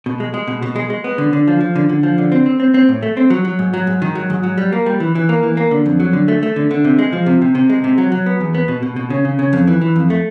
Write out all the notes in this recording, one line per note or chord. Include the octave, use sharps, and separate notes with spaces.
B2
G#3
G#3
B2
B2
G#3
G#3
B3
D3
D3
F3
F3
D3
D3
F3
D3
C4
C4
C4
C4
A2
A3
C4
F#3
F#3
G#2
F#3
G#2
D#3
F#3
G#2
F#3
G3
A#3
G3
E3
E3
A#3
E3
A#3
D3
F2
F#3
D3
A3
A3
D3
D3
C3
G#3
F3
C3
C3
C3
G#3
C3
F#3
F#3
B3
E2
B3
B2
B2
B2
C#3
C#3
C#3
F2
E3
E3
F2
A3